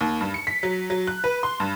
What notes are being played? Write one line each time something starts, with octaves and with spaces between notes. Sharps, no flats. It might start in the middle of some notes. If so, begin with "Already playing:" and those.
D#2
G2
C#7
B6
F#3
F#3
F#6
B4
C6
G2